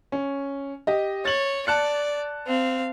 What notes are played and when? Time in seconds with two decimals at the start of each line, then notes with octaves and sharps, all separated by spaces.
0.12 C#4
0.87 G4 D#5
1.25 C#5 A6 F#7
1.67 D5 A5 F#6 C#7
2.46 C4 F5